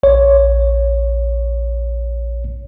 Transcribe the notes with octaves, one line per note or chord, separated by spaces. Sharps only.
A#1 C#5